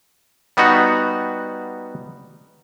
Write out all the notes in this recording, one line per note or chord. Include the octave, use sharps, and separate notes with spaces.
G3 B3 D#4 F#4